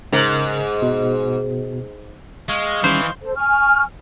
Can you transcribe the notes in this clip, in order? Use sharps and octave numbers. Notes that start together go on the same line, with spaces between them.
G#2 C#3 A#4
B2
G#3 D#5 F5 C#6
D#3 E3 G3 C#4 C5
A4 C5
G#5 C#6 F6